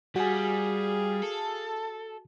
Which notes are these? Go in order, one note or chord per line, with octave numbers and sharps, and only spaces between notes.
G3 F#4 G#4 F5 G#5
A4